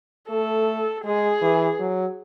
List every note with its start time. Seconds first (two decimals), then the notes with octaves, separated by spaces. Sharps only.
0.30 A3 A4
1.05 G#3 G#4
1.42 E3
1.80 F#3